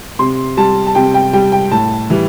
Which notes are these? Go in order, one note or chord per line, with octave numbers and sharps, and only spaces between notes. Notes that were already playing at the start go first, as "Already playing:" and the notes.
C3 C6
G3 A5
A5
C3 G5
G5
G3 G5
G5
A2 A5
E3 G3